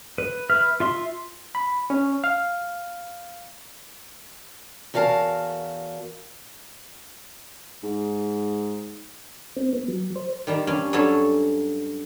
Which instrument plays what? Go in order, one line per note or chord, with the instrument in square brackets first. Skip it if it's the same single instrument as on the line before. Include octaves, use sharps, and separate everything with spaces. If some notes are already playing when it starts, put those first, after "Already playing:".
[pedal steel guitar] B4
B4 E5 F6
F4 E5 C6
[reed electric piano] B5
C#4
F5
[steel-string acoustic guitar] E2 F#4 A#4 F5 A5
[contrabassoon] G#2
[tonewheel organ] C4
B3
F#3
C5
[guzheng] D#3 G3 A5 A#5
G2 C#4 D5 F5
G2 F#3 C#4 A4 C#5 A5